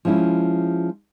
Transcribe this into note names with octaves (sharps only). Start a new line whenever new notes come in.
F3 G#3 C#4 E4